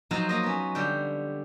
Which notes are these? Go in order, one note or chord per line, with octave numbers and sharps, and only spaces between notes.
F3 F#3 D#4 F4 C5
A#3 D#5
B3 C#4
D3 G3 G5